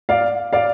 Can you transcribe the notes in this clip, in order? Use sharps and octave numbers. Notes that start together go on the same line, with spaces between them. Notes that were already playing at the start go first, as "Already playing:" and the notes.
D5 F5
D5 F5